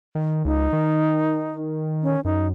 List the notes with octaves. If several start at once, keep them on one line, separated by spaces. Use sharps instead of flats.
D#3
C#2 D#4
D#3
C#4
F#2 D#4